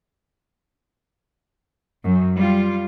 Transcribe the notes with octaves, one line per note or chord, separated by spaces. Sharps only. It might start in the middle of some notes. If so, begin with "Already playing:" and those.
F#2
G3 F4